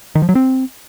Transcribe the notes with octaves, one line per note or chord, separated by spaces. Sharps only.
D#3
F3
F#3
C4